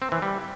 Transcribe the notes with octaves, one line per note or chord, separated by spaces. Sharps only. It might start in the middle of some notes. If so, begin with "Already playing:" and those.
C4
E3
G3